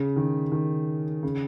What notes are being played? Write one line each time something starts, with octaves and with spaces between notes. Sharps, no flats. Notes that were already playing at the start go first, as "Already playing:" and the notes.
Already playing: C#3
D#3
D#3
C#3